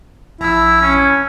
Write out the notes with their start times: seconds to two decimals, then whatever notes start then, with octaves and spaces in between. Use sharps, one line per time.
0.41 A#1 E4 E6
0.81 C#4